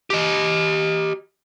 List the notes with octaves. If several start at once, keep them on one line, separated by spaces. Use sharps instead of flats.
G4 D#5